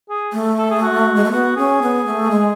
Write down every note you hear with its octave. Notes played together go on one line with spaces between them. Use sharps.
G#4
A3
A4
G#4
F#4
G#3
A3
B3 F#4
C#4 G#4
B3
A3
G#3